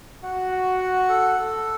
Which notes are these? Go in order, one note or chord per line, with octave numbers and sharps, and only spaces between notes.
F#4 F#5
F#5
F#5
A4
A4